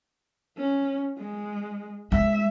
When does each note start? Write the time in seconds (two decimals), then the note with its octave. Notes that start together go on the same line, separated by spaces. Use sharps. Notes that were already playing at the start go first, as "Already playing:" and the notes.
0.57 C#4
1.18 G#3
2.12 G#3 E5